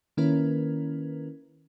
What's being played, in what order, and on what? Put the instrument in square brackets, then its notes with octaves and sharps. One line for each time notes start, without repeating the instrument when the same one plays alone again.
[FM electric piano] D#3 A#3 C#4 E4 A#4 B4